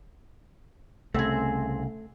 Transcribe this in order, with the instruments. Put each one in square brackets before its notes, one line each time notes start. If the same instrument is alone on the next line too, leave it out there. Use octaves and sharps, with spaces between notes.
[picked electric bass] C2 C#3 [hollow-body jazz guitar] A3 [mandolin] C4 G#4